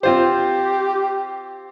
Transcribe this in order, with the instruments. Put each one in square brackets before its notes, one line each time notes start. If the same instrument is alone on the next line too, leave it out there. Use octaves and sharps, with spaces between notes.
[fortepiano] C4 F4 C5 [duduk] G4